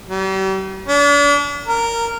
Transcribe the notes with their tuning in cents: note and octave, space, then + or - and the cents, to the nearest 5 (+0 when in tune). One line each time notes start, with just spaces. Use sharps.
G3 -40
D4 -40
A#4 -10